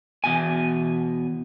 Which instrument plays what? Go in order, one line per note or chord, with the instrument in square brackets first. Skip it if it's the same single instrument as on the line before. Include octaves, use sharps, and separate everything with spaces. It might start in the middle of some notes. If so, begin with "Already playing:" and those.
[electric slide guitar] E2 B2 G#5